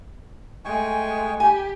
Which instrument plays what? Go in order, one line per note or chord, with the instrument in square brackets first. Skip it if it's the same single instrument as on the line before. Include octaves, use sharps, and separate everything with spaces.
[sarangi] G#3 [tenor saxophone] A3 [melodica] G5 G#5 C#6
[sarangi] G4 [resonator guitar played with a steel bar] G#5